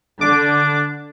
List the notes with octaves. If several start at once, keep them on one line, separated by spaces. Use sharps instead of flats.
D3 D4 D6